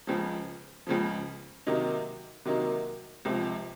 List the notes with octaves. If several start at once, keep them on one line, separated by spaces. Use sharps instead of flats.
C#2 C#3 F3
C#2 C#3 F3
C3 D#3 F#3 A#3 D#4
C3 D#3 F#3 A#3 D#4
C#2 C3 F3